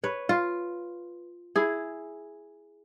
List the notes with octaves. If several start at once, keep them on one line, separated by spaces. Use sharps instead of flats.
B4 C#5
F4
E4 G#4